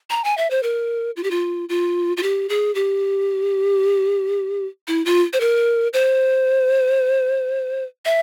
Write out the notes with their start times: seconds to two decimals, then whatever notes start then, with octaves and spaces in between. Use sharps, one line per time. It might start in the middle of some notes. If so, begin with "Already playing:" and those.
0.10 A#5
0.24 G#5
0.38 E5
0.50 C5
0.63 A#4
1.17 F4
1.23 G4
1.31 F4
1.69 F4
2.17 F4
2.23 G4
2.49 G#4
2.75 G4
4.88 E4
5.05 F4
5.33 C5
5.40 A#4
5.93 C5
8.05 E5